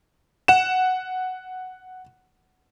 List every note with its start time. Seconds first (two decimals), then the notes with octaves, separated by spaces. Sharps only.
0.48 F#5 E7